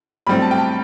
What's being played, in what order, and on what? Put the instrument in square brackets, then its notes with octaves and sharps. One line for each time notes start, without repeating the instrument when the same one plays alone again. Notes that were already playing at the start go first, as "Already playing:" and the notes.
[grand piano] B1 A2 G3 C4 B5
A5
G5
A5